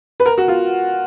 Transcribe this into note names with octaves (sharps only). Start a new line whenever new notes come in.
B4
A#4
F#4
F4